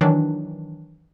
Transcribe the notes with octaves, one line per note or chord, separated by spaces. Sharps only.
D#3 E3 F#3 D4